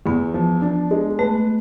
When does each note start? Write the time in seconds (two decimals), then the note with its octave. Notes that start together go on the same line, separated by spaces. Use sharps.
0.06 E2 B3
0.34 F3
0.62 D4
0.91 G#3
1.19 A3 B4